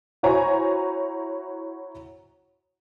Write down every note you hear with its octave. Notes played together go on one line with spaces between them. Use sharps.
E4 F#4 C5 C#5 G#5 A#5